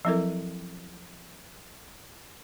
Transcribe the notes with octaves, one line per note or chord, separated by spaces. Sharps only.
F3 F#3 C4 E4 A4 A#4